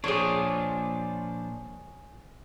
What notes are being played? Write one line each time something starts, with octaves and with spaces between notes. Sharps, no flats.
A#2 F3 D4 G#4 C#5